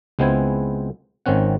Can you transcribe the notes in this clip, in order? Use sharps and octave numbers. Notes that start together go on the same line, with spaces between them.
C#2 G#3 B3 C4 E4 G#5
G#1 D#3 C4 C#4 F#5